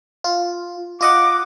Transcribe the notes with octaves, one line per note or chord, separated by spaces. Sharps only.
F4
F4 D#5 F#5 D6